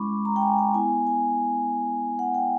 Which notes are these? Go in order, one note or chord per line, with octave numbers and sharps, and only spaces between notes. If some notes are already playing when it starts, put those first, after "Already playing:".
Already playing: G#3 C#4 E4 B5 C#6 D6
A#5
G5
G#5
G5
B3 E4 G#5
G#5
F#5
G5